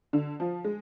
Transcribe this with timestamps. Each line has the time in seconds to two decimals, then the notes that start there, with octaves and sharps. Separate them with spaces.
0.13 D3
0.40 F3
0.64 G#3